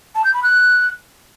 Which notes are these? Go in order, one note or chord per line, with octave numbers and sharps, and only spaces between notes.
A5
G6
B5
F#6